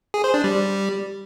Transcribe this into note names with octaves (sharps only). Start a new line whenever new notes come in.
G#4
C5
D4
G3